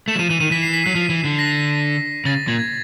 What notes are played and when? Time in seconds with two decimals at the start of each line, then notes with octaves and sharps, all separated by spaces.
0.08 A3 E7
0.15 F#3
0.19 F3 D#7
0.30 E3 D#7
0.40 D#3 D#7
0.51 E3 B6
0.62 C7
0.73 B6
0.84 F#3 C7
0.95 F3 B6
1.10 E3
1.24 D3
1.39 A#6
2.25 C#3 A6
2.48 A#2 G#6
2.59 G#6